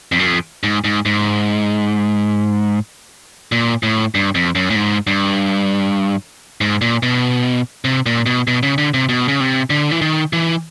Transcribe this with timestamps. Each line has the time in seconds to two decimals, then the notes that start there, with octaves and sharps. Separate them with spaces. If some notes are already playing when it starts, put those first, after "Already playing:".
0.12 F2
0.19 F#2
0.26 F2
0.63 G#2
0.84 G#2
1.05 G#2
3.52 A#2
3.83 A2
4.15 G2
4.35 F2
4.55 F#2
4.70 A2
4.76 G#2
5.07 G2
6.61 G#2
6.81 A#2
7.03 B2
7.85 C3
8.06 A#2
8.26 B2
8.47 B2
8.63 C#3
8.78 D3
8.94 C3
9.09 B2
9.28 C#3
9.40 C3
9.70 D3
9.91 E3
10.02 D#3
10.33 E3